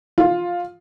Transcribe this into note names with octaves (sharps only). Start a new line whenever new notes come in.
F4